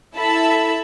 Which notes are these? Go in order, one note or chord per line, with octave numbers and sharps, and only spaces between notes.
E4 A4 E5 A5 B5